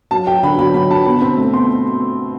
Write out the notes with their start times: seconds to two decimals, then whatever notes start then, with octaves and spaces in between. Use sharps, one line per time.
0.11 F#3 A5
0.27 F#3 G5
0.43 D3 B5
0.58 F#3 B5
0.74 F#3 B5
0.90 D3 A5
1.06 B2 B5
1.21 C4
1.37 A3
1.53 B2 C6